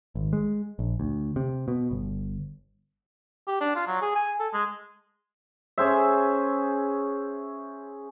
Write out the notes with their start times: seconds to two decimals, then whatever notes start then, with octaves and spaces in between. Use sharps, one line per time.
0.15 G#1
0.33 G#3
0.79 A#1
1.00 D2
1.36 C3
1.68 B2
1.91 G1
3.47 G4
3.61 D4
3.76 F4
3.87 F#3
4.02 G#4
4.15 G#5
4.39 A4
4.53 G#3
5.78 C#4 G#4 C5 E5